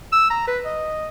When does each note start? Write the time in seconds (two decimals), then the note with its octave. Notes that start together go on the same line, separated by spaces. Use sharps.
0.13 E6
0.30 A#5
0.47 B4
0.65 D#5